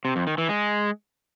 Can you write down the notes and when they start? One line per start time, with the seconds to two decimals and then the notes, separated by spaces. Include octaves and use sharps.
0.05 C3
0.16 F2
0.27 D#3
0.38 E3
0.49 G#3